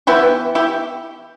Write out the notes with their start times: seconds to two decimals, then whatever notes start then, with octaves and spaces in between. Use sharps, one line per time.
0.07 E3 B3 E4 G4
0.55 E4 G4